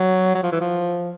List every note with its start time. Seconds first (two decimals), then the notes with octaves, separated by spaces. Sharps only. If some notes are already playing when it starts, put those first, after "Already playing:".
Already playing: F#3
0.34 F#3
0.43 F3
0.52 E3
0.61 F3